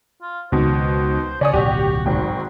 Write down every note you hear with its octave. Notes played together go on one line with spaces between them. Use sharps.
F4
C#2 B2 D#3 C5
C#3 C#5 D5 G#5 D#6
D1 B1 A2 F#4 G4
G#1 G#2 F#4 G5